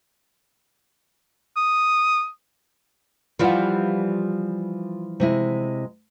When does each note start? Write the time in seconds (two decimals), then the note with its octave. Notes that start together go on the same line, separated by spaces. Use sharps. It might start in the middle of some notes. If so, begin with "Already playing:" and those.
1.57 D#6
3.39 E3 F3 G3 F4 F#5
5.20 C3 G#3 E4